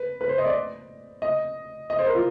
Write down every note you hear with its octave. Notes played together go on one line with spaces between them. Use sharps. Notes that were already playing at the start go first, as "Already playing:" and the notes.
Already playing: B4
B4
C5
D#5
D5
D#5
D#5
C5
A#4
F4